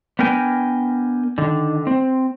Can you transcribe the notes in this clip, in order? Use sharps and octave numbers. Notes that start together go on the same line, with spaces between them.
B3 D4 A#4 G5 G#5
D3 D#3
C4